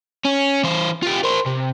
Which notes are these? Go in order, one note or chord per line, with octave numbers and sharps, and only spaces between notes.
C#4
E3 C5
F4 G4
A#4 C5
C3